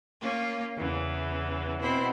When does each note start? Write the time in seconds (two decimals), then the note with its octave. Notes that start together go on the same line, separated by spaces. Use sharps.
0.21 A#3 C#4 F4
0.75 E2 C#3 E3
1.80 B2 C4 E4 C5 B5